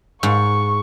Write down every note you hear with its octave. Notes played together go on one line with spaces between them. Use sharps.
G#2 C#6